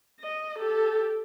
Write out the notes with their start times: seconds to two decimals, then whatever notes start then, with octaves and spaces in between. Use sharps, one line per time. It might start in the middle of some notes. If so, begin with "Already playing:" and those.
0.20 D#5
0.59 G4 A4